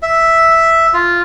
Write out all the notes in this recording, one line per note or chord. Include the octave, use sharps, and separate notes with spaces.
E5
F4